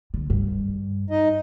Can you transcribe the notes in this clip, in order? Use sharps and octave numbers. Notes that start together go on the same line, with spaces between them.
D3
G2
D#4 D#5